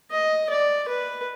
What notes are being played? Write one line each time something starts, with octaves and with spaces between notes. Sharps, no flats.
D#5
D5
B4